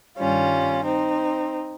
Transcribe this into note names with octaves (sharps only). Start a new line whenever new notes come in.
G2 D#3 G3 C#4 F4
C4 D#4